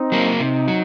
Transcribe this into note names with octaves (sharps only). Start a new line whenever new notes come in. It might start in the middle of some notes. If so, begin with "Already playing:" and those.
Already playing: C4 D#4
F#3 A#3
C3 C4 D#4
F#3